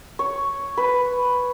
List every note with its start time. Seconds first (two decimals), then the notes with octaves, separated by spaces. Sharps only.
0.19 C#5
0.77 B4